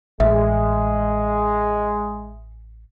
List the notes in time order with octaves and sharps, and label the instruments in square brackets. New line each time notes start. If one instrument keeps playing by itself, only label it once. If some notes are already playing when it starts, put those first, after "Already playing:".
[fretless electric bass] A1 [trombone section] G#3 [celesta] E5